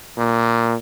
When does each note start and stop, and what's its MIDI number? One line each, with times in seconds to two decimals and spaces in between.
0.18 0.75 46